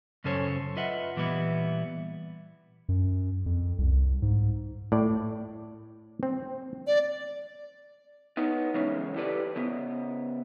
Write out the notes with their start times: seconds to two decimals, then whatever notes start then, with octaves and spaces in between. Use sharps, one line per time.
0.24 F#2 C#3 C#4 A4 C5 C#5
0.77 F4 B4 D#5 E5 F#5
1.17 A#2 E3 G3 B3 E4
2.89 F#2
3.46 F2
3.78 C2
4.22 G#2
4.92 A2 D5
6.23 C4
6.87 D5
8.37 B3 D#4
8.74 C#3 E3 G#3 C#4
9.16 E4 G4 A4 B4 D5
9.56 C#3 B3